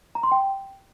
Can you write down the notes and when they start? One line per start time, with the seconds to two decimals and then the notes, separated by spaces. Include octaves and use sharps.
0.15 A#5
0.23 C6
0.32 G5